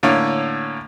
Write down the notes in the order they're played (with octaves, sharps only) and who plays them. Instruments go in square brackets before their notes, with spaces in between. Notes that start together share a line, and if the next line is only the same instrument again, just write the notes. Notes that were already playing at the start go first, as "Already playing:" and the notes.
[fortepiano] A2 D3 A#3 C#4